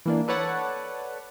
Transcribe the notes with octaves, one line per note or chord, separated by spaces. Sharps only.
E3 A#3 D4
A4 B4 C#5 D5 F#5 A5